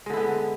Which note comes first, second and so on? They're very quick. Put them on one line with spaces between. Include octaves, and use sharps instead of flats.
G#3 D3 E4 B3